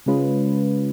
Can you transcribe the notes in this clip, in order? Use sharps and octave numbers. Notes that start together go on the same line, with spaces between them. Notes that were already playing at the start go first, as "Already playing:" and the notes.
C#3 G#3 C#4 F4 B4